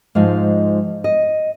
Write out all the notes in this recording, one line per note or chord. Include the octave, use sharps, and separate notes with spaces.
G#2 F3 G#3 F5
D#5